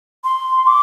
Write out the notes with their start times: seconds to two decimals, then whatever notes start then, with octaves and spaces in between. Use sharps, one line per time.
0.24 C6
0.67 D6